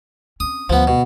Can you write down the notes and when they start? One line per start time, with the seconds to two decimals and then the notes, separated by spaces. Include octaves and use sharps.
0.40 C4 C#4 D#6
0.69 D2 F3 G3 B3
0.87 B2